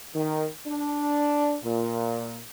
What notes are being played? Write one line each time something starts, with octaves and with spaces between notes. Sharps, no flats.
D#3
D4
A#2